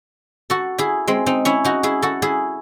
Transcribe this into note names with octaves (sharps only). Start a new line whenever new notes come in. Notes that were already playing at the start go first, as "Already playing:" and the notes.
F#4 A4
E4 G#4
G#3 C4
C4 D#4
C#4 E4
D#4 F#4
E4 G#4
F#4 A4
E4 G#4